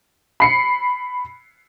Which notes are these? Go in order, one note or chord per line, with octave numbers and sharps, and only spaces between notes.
B5 C7 C#7